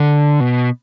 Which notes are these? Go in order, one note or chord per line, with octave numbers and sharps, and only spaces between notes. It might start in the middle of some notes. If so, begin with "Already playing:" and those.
Already playing: D3
B2